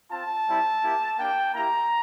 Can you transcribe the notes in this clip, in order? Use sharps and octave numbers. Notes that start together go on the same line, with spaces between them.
C4 F4 A5
G3 C4 E4
A#3 E4 G4
A#3 D4 G4 G5
A#3 E4 G4 A#5